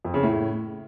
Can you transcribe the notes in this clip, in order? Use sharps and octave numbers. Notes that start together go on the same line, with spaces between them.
F2
C#3
A2